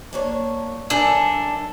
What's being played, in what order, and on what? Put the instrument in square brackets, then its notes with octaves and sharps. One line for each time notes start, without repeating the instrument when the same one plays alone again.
[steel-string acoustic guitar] A#3 D4 C#5
[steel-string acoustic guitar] F#2 A#4 G#5 [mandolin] D4 A4